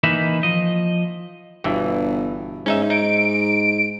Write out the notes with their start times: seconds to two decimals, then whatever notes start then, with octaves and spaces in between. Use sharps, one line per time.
0.03 E3 A#3 D#4 B4 E5
0.43 F3 D#5
1.64 G1 G2 B2 E3
2.66 G#2 C#4 D#4 E5
2.90 D#4 D7